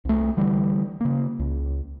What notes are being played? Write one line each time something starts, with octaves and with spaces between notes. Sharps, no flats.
C2 A3
D3 E3 G3
C#3 A#3
C#2